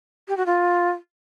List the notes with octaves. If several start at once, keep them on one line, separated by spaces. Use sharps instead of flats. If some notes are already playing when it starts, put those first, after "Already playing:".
G4
F#4
F4